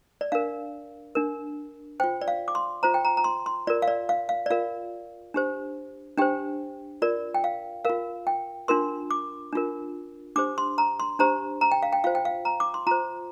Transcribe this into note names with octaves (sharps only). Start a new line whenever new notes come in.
D5
D4 A#4 F5
D4 A#4
F4 C5 G5
D5
F5
D6
C6
F4 C5 A#5
G5
A#5
A#5
C6
C6
F4 A#4 D5
F5
D5
F5
F5
D5
F4 A#4 F5
D4 G4 C5
D4 G4 C5 G5
F4 A#4 D5
G5
F5
F4 A#4 F5
G5
D4 F4 A#4 C6
D6
D4 F4 A#4
D4 G4 C5 D6
C6
A#5
C6
D4 G4 C5 A#5
A#5
G5
F5
G5
F4 C5 F5
G5
F5
A#5
D6
C6
F4 C5 A#5